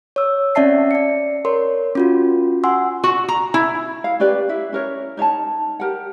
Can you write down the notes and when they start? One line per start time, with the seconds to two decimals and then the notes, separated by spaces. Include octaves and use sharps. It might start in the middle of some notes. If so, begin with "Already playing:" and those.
0.16 C#5 E6
0.55 C4 C#4 D5 E5 A5 C7
0.91 D5 C#7
1.45 A#4 C#5 C6
1.95 C#4 F4 F#4
2.64 F#5 G#5 C6 E6
3.04 F#4
3.28 A#5
3.54 E4
4.04 F5
4.20 C#4 G4 B4 D5
4.49 E4 E5
4.72 C#4 A#4 C#5
5.17 D#4 C#5 E5 A5
5.80 G4 A#4 F#5